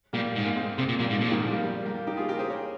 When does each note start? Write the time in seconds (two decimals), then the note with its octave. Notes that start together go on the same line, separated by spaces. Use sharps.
0.13 A#2 G3 A#3
0.36 G#2
0.45 A#3
0.56 G#3 C4
0.78 C3 G#3 C4
0.89 A#2
0.99 A#2 G3 A#3
1.10 G#2
1.21 A#2 F3 G#3
1.32 D#3 G3
1.42 F3 G#3
1.53 G3 A#3
1.64 G3 A#3
1.85 G3 A#3
2.07 D#4 G4
2.17 F4 G#4
2.28 G4 A#4
2.39 G#4 C5
2.49 A#4 C#5